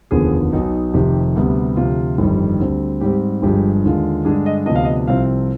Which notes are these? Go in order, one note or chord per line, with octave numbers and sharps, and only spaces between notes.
F1 D#2 D3 F3 B3 G#4
B1 B2 B3 D#4
F1 F2 C3 D#3 G4
D2 C3 G3 B3
D2 C3 F3 F4
G1 F2 D#3 G3
D2 D3 G3 C4
G#2 G3 C4 G4
G1 G2 F3 G#3 G4
D#2 D3 G#3 D4 F4
G2 D3 G#3 D4 G#4
D#5
D2 C3 F3 B3 D4 D#5
F5
D#5
C2 C3 F3 C4 F4 F5